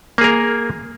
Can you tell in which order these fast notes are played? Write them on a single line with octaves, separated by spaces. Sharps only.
A#3 G#4 A#4